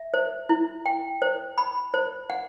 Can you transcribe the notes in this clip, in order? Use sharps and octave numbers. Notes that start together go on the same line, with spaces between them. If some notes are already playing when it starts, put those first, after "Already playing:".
Already playing: E5
C5
E4
G5
C5
B5
C5
F#5